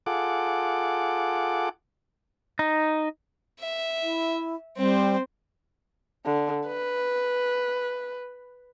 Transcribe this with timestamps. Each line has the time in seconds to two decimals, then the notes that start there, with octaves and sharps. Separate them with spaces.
0.06 F4 G#4 A4 F#5 D6
2.59 D#4
3.60 E5
4.03 E4
4.77 G3 C4 C5
6.25 D3
6.67 B4